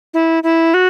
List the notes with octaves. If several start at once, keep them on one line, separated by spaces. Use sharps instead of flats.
E4
E4
F#4